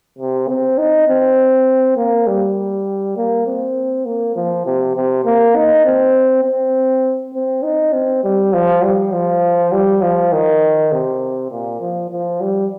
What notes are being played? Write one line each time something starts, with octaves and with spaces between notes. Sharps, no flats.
C3
C4
D#4
C4
A#3
G3
A#3
C4
A#3
F3
C3
C3
A#3
D#4
C4
C4
C4
D#4
C4
G3
F3
G3
F3
G3
F3
D#3
C3
A#2
F3
F3
G3